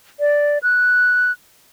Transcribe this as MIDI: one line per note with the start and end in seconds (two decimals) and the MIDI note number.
0.20 0.58 74
0.63 1.32 90